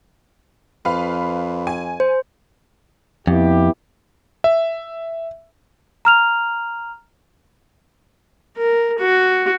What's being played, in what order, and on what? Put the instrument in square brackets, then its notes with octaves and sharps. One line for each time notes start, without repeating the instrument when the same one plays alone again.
[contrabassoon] F2 [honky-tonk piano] B4 F5
[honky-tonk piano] G#5
[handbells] C5
[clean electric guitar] F2 [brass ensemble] B3 E4 G4
[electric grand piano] E5
[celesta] A#5 F6 F7
[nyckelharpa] A#4
F#4